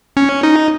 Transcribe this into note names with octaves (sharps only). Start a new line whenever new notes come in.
C#4
D#4